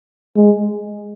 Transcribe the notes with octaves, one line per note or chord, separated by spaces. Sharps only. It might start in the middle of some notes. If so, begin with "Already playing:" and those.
G#3